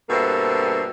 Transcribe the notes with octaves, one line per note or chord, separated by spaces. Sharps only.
G2 B2 A#3 C4 A4 E5